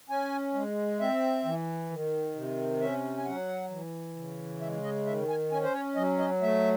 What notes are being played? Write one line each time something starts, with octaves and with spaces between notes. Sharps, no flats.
C#4 G#5
G#3
C4 E5
E3
D#3
C3
C#4 E5
G#5
F#3 F#5
E3
C#3
G#3 E5
D#5
D#3 E5
G#5
C#4 G#5
C5
C#5
F#3 D#5
D#5
A3 E5